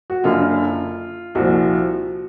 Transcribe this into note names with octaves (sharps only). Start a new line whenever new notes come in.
F#4
F#1 F#2 D3 F4
C2 A#2 F3 F#4